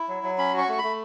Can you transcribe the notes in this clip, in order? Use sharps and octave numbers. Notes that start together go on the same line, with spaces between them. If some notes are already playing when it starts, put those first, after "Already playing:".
Already playing: E4
F#3
F#3
C#4 B5
F#4 C#6
A3 C#6
B5
A3